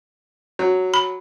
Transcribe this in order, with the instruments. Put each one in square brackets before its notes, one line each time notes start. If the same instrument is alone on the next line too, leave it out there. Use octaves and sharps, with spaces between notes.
[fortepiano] F#3
[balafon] B5